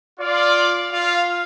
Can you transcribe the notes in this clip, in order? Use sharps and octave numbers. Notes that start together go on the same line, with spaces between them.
F4 D5
F4 F5